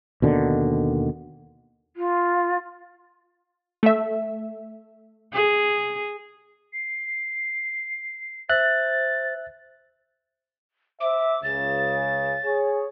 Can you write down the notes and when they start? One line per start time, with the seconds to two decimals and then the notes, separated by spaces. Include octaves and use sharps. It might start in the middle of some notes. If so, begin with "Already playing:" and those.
0.22 D#2 B2 D3 D#3
1.96 F4
3.83 A3 E5
5.33 G#4
6.73 C7
8.49 C5 E5 F#6 A6
11.00 C5 E5 D6
11.43 C#2 C#3 A6
12.45 G#4 C#5